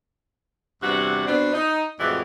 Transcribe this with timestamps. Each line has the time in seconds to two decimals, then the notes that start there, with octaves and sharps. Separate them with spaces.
0.82 E2 G2 C3 E4 F#4 F#5
1.27 B2 B3 C4 D4
1.53 D#4
1.99 F2 A2 E3 G#3 F#4 D5